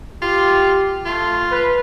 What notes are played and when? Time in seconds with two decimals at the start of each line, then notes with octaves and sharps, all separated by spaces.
0.22 F4 G4
1.06 A3 F4
1.52 B4